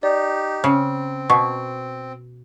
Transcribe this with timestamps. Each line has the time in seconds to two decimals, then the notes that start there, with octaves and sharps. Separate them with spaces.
0.03 D#4 G4 D5
0.64 C#3 C4
1.30 B2 C#6